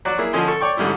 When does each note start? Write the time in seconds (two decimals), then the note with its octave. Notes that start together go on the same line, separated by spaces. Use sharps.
0.05 F#3 F#4 D5
0.18 A#3 E4 G#4
0.33 D3 F3 C#4 D#5 G#5 C6
0.47 A4 C#6
0.61 C#5 D5 G5 C#6
0.77 G#2 D3 G3 C#4 E4